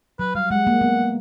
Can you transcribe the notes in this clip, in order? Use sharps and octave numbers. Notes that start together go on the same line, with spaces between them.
F#3 B4
G3 F5
G#3 F#5
A#3
B3